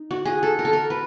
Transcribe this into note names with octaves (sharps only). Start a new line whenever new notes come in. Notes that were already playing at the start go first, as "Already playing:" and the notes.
Already playing: D#4
F#4
G#4
A4
A#4
A4
A#4
B4